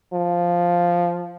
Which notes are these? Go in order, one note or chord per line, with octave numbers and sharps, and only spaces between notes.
F3